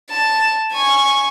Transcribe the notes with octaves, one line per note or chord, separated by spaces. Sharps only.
A5
G#5 C#6